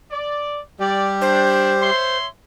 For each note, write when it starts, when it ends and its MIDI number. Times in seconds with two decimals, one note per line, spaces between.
0.11 0.60 74
0.80 1.91 55
0.80 1.91 67
0.80 1.13 74
1.22 1.73 62
1.22 2.17 72
1.82 2.28 73
1.82 2.28 76
1.82 2.28 84